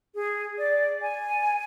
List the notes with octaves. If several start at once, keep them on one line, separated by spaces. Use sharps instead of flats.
G#4
D5
G#5